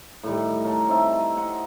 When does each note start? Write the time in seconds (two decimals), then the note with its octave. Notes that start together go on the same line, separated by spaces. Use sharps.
0.23 A2 D#3 G3
0.64 A#4 C#5 G5 A5
0.88 C4 D#4 E5 A5
1.19 G#5
1.37 D#4 F#5 C6